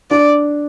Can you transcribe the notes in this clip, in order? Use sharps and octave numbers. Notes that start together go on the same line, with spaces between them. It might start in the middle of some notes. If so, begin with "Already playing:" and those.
D4 D5